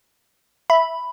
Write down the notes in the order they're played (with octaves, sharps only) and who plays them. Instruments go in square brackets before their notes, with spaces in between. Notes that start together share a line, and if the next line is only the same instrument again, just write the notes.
[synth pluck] E5 [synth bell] B5